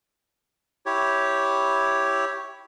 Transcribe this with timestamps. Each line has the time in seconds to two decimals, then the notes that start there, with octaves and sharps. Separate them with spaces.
0.86 E4 G4 C#5